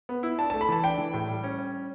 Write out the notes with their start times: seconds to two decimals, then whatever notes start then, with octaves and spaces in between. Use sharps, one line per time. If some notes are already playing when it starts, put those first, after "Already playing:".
0.09 B3
0.23 E4
0.38 D4 A5
0.50 A3 A5
0.61 B5
0.69 E3 A5
0.84 D4 G5
0.98 E3
1.14 A2
1.29 G3
1.44 C#4
1.59 C#4